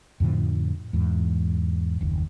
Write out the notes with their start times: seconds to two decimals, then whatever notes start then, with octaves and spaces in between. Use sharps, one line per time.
0.20 F2 A2 D3 F3
0.93 E2 G#2
2.01 F#1 D#2